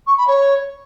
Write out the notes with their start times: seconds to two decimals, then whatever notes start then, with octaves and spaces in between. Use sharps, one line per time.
0.07 C#6
0.17 B5
0.27 C#5